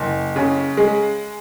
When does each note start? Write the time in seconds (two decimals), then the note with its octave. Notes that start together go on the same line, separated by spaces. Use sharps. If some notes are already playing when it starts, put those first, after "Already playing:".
Already playing: F#1
0.36 C#3
0.77 G#3